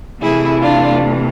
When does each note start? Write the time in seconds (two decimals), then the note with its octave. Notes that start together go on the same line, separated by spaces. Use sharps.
0.22 C3 E3 A3 E4 G#4
0.62 D4 F4